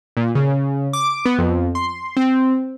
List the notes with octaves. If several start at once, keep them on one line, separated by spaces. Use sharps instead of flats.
A#2
C#3
D6
B3
F2
C6
C4